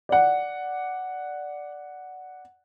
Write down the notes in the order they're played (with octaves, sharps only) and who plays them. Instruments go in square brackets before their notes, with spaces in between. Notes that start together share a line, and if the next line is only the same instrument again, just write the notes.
[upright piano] D5 F#5